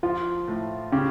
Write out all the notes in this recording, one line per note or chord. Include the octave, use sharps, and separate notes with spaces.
F3 F4
A2
C#3 G4